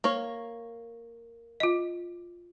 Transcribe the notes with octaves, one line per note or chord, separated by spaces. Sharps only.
A#3 C#5
F4 D#5